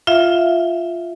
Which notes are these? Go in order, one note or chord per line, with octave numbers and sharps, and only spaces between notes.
F4 E5 F5